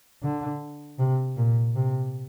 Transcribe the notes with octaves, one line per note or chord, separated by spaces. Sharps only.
D3
C3
A#2
C3